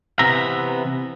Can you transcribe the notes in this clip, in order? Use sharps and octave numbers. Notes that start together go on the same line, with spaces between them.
C3 E3 B3 E5 A#5